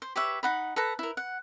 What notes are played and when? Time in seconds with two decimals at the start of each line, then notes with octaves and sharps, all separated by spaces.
0.02 C5
0.16 G4 B4 C#5 E5
0.43 D#4 F#5 B5
0.76 A4 B4 A#5
0.99 E4 A#4
1.17 F#5